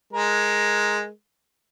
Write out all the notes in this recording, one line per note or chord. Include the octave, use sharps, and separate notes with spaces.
G#3 A#4